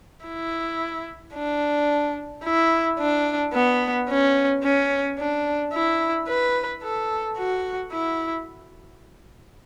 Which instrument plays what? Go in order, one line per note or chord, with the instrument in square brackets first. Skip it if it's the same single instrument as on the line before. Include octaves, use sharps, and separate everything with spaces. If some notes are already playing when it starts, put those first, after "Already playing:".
[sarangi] E4
D4
E4
D4
B3
C#4
C#4
D4
E4
B4
A4
F#4
E4